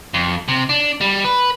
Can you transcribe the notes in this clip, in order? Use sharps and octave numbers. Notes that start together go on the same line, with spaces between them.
F2
C3
D4
G3
B4